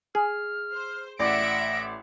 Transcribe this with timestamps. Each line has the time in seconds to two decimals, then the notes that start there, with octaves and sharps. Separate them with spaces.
0.15 G#4 F6
0.72 C5
1.19 A1 D5 E5 F#5 A#6 D7